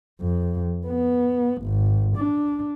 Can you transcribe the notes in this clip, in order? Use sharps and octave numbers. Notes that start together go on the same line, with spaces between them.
F2
B3
G#1
D4